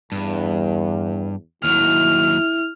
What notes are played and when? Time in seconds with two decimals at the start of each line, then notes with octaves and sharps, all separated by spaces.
0.12 E2 G2
1.64 D#2 F#3 E4 F6